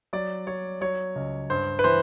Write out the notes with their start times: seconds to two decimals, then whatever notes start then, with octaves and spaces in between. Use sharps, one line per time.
0.13 F#3 D5
0.47 F#3 C#5
0.81 F#3 C#5
1.16 C#2
1.50 G2 C5
1.79 B4
1.84 E3 C5